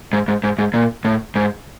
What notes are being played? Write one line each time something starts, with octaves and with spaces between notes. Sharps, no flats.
G#2
G#2
G#2
G#2
A#2
A2
G#2